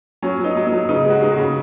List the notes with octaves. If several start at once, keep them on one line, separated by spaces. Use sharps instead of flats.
F#3 C#4
F#3
D#4
F#3
D#4
F#3
C#3 D#4
G#3
F#4
G#3 D#4
F#4
C#3